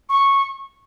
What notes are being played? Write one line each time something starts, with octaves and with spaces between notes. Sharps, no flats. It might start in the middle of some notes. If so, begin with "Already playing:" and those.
C#6